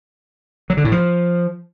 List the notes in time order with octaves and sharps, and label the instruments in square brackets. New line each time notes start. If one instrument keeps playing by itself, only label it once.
[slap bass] F#3
D3
A2
F3